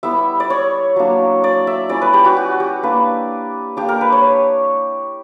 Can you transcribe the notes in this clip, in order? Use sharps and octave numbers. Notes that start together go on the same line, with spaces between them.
G3 B3 E4 E5
D5
C#5
F#3 A#3 D4
D5
E5
G3 C#4 E4 D5
B4
G4
F#4
F#4
G4
A#3 D4 B4
A#3 D4 G4
A#4
B4
C#5